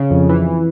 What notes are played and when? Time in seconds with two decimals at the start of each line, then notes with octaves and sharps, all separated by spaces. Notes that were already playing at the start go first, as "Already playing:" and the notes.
Already playing: C#3
0.11 F2
0.29 E3